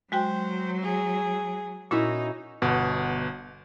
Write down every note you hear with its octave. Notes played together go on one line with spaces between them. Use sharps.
F#3 G#3 F#4 C5 G5
G#4
A#2 C#4 D#4 E4 F#4
G1 B2 F#5